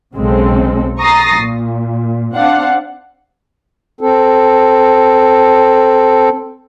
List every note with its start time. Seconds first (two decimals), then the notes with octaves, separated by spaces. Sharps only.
0.15 B1 C#3 G#3 C4 A4
0.99 A#5 C#6 D#6 A6 A#6 C7
1.41 A#2
2.35 C4 D4 F5 F#5
4.01 C4 A4